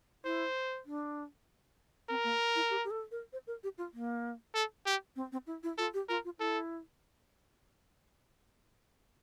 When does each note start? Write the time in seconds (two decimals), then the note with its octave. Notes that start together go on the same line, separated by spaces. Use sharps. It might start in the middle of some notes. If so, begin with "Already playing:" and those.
0.25 E4 C5
0.86 D4
2.10 C4 A#4
2.24 A#3
2.56 E4
2.70 G4
2.84 G4
2.91 A4
3.11 A#4
3.33 C5
3.47 A#4
3.63 G4
3.78 F4
3.94 A#3
4.55 A4
4.86 G4
5.16 C4
5.32 C4
5.47 E4
5.63 E4
5.78 F4 A4
5.94 G4
6.09 F4 A#4
6.25 F4
6.39 E4 A4